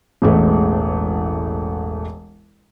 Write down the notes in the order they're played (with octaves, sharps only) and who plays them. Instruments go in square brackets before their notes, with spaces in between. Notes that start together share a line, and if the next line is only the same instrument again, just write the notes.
[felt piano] E1 A1 G#3 A3